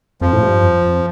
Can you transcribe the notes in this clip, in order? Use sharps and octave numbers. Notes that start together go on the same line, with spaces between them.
F2 F3
A2
G2
F2
F2